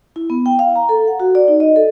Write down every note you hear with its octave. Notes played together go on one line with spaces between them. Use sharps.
E4
B3
G5
F5
A#5
A4
F#5
F#4
D5
D#4
D#5
A4